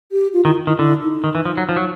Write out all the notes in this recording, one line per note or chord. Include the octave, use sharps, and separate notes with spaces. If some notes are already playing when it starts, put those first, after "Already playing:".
G4
F4
D#3 E4
D#3 E4
D3 E4
D#4
D#3
E3
F3
F#3
F3
F#3